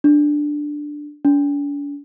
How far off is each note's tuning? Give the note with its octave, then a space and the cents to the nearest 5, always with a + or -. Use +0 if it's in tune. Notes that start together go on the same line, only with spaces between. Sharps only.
D4 +5
D4 -45